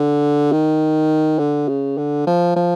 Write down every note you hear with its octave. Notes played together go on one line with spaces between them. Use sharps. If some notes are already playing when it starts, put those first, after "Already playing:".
Already playing: D3
D#3
D3
C#3
D3
F3
F3